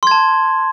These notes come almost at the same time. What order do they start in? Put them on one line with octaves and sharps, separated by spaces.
C6 G#6 A5